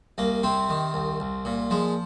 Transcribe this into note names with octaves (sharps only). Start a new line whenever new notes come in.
C2 A#3
C3 C4
D#3
C2
C2
A#2
F3 G#3